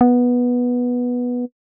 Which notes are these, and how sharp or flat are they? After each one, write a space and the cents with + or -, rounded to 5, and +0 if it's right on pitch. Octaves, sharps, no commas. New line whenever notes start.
B3 -10